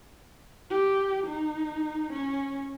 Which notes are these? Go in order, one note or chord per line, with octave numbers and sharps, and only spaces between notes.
G4
D#4
C#4